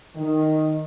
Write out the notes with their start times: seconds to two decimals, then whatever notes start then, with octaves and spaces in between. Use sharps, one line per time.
0.16 D#3